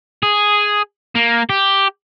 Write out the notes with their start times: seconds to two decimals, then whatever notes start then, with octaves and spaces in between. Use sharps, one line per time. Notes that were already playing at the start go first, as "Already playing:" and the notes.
0.23 G#4
1.15 A#3
1.49 G4